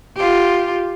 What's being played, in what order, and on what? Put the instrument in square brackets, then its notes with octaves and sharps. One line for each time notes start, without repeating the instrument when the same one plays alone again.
[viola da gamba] F4 G4